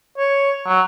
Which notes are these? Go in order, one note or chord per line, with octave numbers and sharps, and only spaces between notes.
C#5
F#3